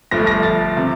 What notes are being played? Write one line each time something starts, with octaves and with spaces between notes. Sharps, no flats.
G1 G2 F3 A3 A#6
A#6
A6
C3 F3